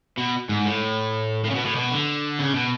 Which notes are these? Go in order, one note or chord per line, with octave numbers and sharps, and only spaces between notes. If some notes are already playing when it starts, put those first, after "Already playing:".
B2
G#2
A2
A2
C#3
B2
A2
B2
D3
C#3
B2